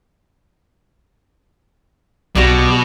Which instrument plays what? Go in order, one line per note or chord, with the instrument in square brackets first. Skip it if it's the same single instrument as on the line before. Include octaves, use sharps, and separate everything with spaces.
[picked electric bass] B1 [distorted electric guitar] B2 [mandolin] F#4 G4 D5